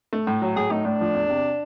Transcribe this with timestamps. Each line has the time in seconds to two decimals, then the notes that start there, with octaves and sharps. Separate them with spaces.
0.13 A3
0.27 A2
0.42 F#3
0.56 A2 G#4
0.71 A3 D#4
0.85 A2 D4
1.01 F3
1.15 E2
1.29 C3